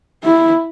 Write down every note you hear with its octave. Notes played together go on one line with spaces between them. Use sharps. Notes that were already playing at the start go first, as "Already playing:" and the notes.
E4